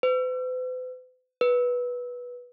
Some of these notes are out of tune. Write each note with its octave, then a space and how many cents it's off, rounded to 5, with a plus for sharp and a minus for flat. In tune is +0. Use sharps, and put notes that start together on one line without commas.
B4 +45
B4 -10